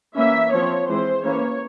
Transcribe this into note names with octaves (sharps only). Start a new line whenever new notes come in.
E3 A#3 C#4 E5
F3 C4 C#5
E3 G#3 C4 C5
E3 A#3 C#4 C#5